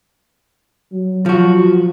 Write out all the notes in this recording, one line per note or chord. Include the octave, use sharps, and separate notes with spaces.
F#3
F3 F#4